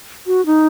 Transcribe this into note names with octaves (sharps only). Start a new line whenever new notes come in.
F#4
D#4